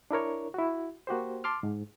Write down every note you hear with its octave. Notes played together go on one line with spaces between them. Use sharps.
D4 E4 A#4 C#5
E4 F#4
A#3 F#4 G4 C5
A5 C6 D6 F6
G#2